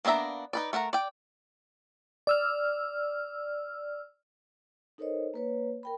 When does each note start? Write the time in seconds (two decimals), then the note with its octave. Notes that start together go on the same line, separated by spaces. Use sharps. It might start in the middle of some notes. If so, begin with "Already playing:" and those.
0.05 A#3 B3 D4 E5 A#5
0.53 D#4 B4 D5
0.73 A3 A#4 F#5 A#5
0.93 D5 G5
2.27 D5 E6 F6
4.98 D#4 A4 A#4 C5 C#5 D#5
5.34 A#3 B4 C#5
5.83 A#4 G5 B5